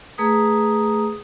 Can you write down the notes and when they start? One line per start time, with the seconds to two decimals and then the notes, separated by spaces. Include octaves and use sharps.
0.18 A3 G#4 B4 A#5 D#6